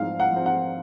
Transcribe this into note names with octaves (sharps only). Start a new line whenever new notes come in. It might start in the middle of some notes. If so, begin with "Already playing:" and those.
Already playing: G#2 F3 C4 F5
F#5
F3 C4
F#5